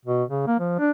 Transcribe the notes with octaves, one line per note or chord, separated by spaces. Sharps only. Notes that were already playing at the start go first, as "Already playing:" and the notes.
B2
C#3
A#3
F3
D4